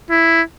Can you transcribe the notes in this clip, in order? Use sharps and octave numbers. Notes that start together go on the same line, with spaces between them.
E4